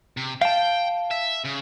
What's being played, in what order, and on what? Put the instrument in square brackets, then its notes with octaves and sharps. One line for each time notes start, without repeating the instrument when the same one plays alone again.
[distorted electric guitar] C3
[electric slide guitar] F5 A5 [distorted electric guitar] G5
[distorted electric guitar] E5
C#3